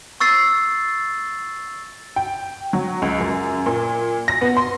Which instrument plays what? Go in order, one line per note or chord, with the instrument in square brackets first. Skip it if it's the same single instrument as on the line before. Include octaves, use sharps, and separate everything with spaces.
[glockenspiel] C#6 E6 A6 C7
[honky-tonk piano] G5
F#3
C#2
F#2
A#2
A#6
B3
C6